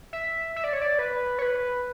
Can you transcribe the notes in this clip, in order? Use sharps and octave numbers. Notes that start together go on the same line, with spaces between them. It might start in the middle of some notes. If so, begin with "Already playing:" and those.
E5
E5
D5
C#5
D5
B4
C#5
B4